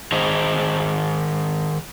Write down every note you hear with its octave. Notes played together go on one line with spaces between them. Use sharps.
D#3 G#4 C5 D#5 A#5